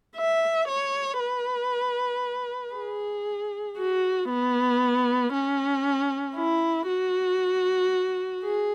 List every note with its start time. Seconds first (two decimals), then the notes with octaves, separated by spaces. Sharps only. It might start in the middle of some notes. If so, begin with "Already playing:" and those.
0.17 E5
0.68 C#5
1.20 B4
2.74 G#4
3.78 F#4
4.29 B3
5.33 C#4
6.36 E4
6.88 F#4
8.43 G#4